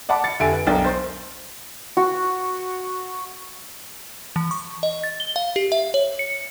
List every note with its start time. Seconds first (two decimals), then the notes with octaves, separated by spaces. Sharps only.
0.09 D5 F#5 A5 B5 D6
0.24 A6 C#7
0.40 F1 D3 G4 E5 G#5 D7
0.52 B4
0.67 B1 D4 A#4 G5 A6
0.85 C5 C6
1.97 F#4
4.36 E3
4.51 C#6
4.83 D#5
5.04 A6
5.20 G7
5.36 F5
5.56 G4
5.72 E5
5.94 C#5
6.19 C#7